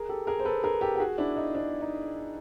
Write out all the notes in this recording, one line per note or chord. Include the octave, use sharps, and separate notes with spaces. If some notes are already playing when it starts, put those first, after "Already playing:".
Already playing: G#4 A#4
G4 A4
G#4 A#4
C5
A4 B4
G#4 A#4
G4 A4
G4
F#4 G#4
D4 E4
D#4
D4
D#4